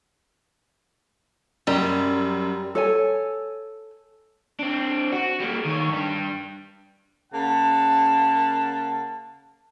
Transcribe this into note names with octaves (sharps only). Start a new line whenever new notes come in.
F#2 G3
A4 C#5 G#5
C4 D4
F#4
G3 A#3
D#3 C#5
G2 G3
C#3 A#3 F#5 A5